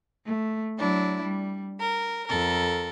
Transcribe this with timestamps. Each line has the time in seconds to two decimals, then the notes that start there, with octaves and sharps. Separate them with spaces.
0.24 A3
0.78 F#3 D4 E4
1.22 G3
1.79 A#4
2.27 F2 A4 A#4